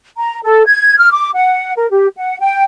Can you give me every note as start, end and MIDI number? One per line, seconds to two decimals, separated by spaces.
0.18 0.39 82
0.43 0.66 69
0.66 0.97 92
0.98 1.09 89
1.11 1.30 86
1.35 1.72 78
1.76 1.87 70
1.91 2.07 67
2.16 2.38 78
2.40 2.63 79